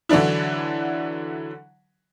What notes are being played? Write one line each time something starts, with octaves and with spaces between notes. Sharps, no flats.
D3 E3 F#3 D4 E4